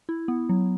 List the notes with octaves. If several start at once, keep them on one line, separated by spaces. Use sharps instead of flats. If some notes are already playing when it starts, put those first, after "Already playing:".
E4
B3
F#3